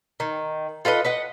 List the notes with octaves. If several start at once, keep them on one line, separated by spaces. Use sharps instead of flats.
D#3
F4 A4 B4 D#5
B4 D#5 F#5